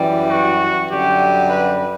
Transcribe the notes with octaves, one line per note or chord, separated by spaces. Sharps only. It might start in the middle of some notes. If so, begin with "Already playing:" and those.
Already playing: F#2 E3 G3
F#4
F#2 D3 G3 G4
B4